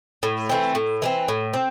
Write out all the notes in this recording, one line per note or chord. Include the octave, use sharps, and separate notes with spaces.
A2
E3 A3 C4
A2
E3 A3 C4
A2
C4